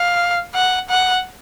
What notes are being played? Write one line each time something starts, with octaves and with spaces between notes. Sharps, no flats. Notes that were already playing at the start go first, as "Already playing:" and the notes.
Already playing: F5
F#5
F#5